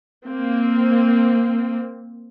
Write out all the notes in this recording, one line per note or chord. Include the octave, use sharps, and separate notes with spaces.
A#3 C4